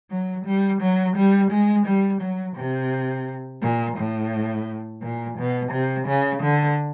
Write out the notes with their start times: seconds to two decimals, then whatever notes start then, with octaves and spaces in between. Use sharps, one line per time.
0.11 F#3
0.45 G3
0.81 F#3
1.17 G3
1.51 G#3
1.86 G3
2.21 F#3
2.56 C3
3.62 A#2
3.97 A2
5.02 A#2
5.38 B2
5.72 C3
6.07 C#3
6.42 D3